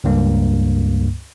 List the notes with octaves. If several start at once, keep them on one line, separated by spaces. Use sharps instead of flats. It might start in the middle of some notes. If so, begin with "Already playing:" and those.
C#2 G2 A#3